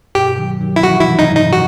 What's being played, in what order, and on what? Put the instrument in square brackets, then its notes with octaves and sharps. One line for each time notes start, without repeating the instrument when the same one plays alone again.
[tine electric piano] G2 B2 [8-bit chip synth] G4
[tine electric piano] D#3 F#3
D#3 F#3
[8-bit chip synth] E4
[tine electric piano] E3 G3 [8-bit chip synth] F#4
[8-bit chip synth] E4
[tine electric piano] C3 E3
[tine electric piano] A2 [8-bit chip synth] D#4
[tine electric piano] G2
[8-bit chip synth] D#4
F#4